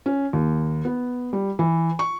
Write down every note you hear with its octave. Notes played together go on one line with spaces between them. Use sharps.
C#4
D#2
B3
G3
E3
C#6